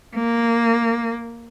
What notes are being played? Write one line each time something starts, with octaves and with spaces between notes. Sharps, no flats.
A#3